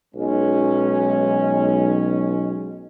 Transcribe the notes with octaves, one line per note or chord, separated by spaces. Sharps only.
B1 G#3 C#4